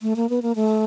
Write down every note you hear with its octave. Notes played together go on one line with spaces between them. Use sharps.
A3
A#3
B3
A#3
A3